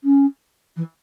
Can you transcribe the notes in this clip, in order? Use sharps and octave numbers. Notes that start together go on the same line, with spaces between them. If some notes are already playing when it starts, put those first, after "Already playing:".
C#4
E3